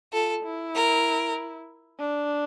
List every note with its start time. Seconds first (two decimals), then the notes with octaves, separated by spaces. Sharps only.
0.13 F4 A4
0.43 E4
0.75 A#4
1.99 D4